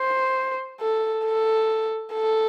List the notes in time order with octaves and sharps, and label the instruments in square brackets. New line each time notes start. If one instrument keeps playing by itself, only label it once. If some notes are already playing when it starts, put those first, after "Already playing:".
Already playing: [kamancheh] C5
A4
A4
A4